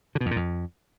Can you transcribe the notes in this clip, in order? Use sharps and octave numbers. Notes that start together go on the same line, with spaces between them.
D3
B2
F2
A#2
F2